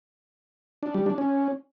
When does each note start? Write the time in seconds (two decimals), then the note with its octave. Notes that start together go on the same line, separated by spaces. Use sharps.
0.83 D4
0.94 G3
1.06 D4
1.18 C#4